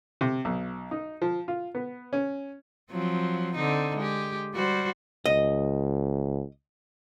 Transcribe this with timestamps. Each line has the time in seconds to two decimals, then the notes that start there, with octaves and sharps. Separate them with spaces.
0.21 C3
0.45 B1
0.91 D#4
1.22 F3
1.48 F4
1.75 B3
2.13 C#4
2.91 F3 F#3 C4
3.56 D3 C4 D#4
3.97 G#3 G4
4.54 G3 F#4 C5
5.26 C#2 D#5